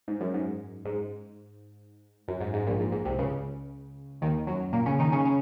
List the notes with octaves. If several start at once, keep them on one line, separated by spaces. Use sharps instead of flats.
G#2
F#2
G#2
G#2
F#2
G#2
G#2
A#1 A#2
G#2
G#2
C2 C3
C#2 C#3
D#2 D#3
F#2 F#3
A#2 A#3
C#3 C#4
D#3 D#4
C#3 C#4
C#3 C#4